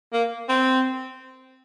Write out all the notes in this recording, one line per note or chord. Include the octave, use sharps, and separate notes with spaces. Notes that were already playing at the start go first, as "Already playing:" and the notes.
A#3
C4